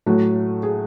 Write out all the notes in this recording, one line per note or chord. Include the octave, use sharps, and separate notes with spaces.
A2 F#3 A3 F#4
G#4